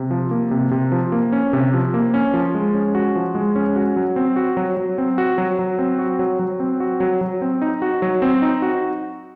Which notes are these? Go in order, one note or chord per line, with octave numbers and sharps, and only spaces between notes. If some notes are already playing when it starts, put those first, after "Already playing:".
Already playing: C3
F3
A#3
C3
C3
F3
A#3
C#4
C3
F3
A#3
C#4
F3
G#3
C#4
F#4
F3
G#3
C#4
F#4
F#3
C4
F#4
F#3
F#3
C4
F#4
F#3
F#3
C4
F#4
F#3
F#3
C4
F#4
F#3
F#3
C4
D#4
F#4
F#3
C4
D#4
F#4